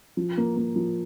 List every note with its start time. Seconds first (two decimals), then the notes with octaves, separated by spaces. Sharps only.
0.17 F3
0.37 A#3
0.57 A#3
0.76 F3